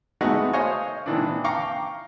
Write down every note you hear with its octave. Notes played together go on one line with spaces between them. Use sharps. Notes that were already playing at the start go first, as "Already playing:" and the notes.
G#3 A3 B3 D#4 F#4
C5 C#5 D#5 F5 G#5 C#6
A#2 D#3 E3 D4
F5 G5 A#5 C#6 D6